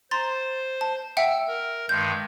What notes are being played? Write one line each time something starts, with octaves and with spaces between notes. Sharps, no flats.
C5 A#5 C6 A6
A5
E5 F#5 G5 E6
A#4
G2 D#3 G#3 G6